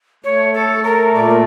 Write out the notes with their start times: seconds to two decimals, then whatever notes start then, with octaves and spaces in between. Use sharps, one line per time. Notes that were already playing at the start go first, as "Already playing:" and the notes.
0.24 A3 C#5
0.54 A4
0.69 A3
0.84 A#4
1.14 A#2 D5
1.29 A#4